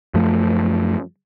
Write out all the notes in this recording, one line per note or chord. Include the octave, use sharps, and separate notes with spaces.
F#2 F3 A3